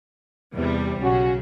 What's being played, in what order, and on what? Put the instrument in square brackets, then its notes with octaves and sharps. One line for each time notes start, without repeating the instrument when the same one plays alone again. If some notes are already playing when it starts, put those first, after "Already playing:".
[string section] E2 C3 G3
[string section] B1 C#3 [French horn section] C#4 F#4